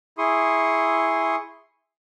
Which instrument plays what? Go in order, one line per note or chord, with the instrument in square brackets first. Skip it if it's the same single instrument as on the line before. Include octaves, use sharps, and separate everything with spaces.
[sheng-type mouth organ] E4 G#4 C6 C#6 D#6